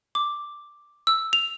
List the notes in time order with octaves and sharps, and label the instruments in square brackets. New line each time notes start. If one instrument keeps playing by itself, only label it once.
[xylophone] D6
E6
F7